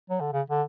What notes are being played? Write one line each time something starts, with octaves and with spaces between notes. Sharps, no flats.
F#3
D3
C#3
D3